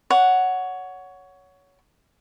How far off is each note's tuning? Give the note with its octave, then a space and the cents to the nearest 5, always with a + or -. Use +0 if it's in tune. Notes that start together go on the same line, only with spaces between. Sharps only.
C#5 +15 F#5 +0